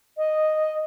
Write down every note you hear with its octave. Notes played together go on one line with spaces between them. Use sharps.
D#5